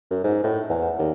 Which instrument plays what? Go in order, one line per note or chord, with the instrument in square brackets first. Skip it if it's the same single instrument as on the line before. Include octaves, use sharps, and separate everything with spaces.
[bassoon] F#2
G#2
A2
E2
D#2